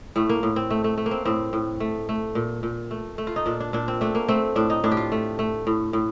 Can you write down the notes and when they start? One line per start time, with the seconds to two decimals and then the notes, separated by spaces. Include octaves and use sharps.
0.16 A2 A3
0.29 A#3
0.43 A2
0.56 C4
0.70 A3
0.84 A3
0.98 A3
1.06 A#3
1.11 C4
1.25 A2 C4
1.53 A2
1.80 A3
2.09 A3
2.35 A#2
2.63 A#2
2.91 A3
3.18 A3
3.27 F4
3.36 D#4
3.46 A#2 D4
3.60 D4
3.73 A#2 D4
3.88 C4
4.01 A3 D4
4.15 A#3
4.28 A3 C4
4.56 A2 D4
4.70 D#4
4.84 A2 D4
4.91 G4
4.97 F4
5.12 A3
5.39 A3
5.67 A2
5.93 A2